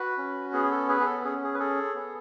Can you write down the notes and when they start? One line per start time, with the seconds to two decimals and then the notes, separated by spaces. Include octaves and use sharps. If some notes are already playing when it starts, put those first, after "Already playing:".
Already playing: F#4 B4
0.18 C#4
0.53 B3 G#4
0.71 A4
0.89 G#4 B4
1.00 G#4
1.06 A4
1.24 C#4 G#4
1.44 G#4
1.54 B4
1.59 G#4 A4
1.95 B3